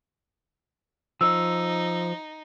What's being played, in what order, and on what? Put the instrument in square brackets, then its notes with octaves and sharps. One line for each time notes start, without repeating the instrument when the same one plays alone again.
[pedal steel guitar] F3 [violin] D#4 [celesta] E6